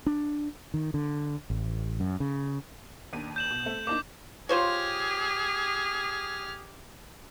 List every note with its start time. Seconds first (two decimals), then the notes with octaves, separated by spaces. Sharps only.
0.06 D4
0.74 D#3
0.94 D3
1.50 A1
2.00 F#2
2.20 C#3
3.13 D#2 D4 D#7
3.36 G6 E7 F#7
3.50 B2
3.63 A3 C4
3.87 A#3 D4 D#4 D6
4.49 F4 G4 G#4 C5 C#5 F6